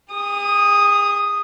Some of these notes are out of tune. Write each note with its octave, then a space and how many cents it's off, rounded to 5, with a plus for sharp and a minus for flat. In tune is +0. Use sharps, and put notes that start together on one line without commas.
G#4 -45 D#6 +0